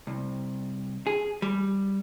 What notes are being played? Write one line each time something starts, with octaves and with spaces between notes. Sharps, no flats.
C2
G#4
G3